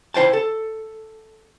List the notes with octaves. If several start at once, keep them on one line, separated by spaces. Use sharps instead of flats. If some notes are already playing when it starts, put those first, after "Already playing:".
E4 C5 G5 A5
A4